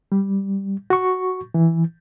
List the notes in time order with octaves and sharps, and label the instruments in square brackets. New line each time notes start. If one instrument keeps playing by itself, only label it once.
[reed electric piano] G3
F#4 C#6
E3